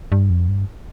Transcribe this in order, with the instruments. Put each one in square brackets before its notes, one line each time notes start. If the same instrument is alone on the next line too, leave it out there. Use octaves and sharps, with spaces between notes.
[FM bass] G2
F2
G2